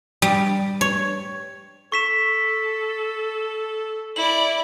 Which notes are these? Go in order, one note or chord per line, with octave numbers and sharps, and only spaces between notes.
G3
C#5
A4 C#6 B6 E7
E4 D5 F#7